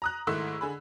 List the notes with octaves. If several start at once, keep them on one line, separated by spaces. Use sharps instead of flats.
A#5 D#6 F#6
G#2 D#3 A3 E4 C6 E6
D3 G#4 B5